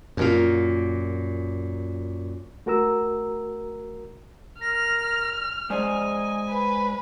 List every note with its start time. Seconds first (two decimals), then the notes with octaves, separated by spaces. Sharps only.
0.17 F#2 A#2 F3 A#3 F4
2.66 A3 F#4 A#4 A#5 E6
4.61 A#4 F6 A#6
5.70 G#3 C5 D5 D#5 G#5
6.49 B4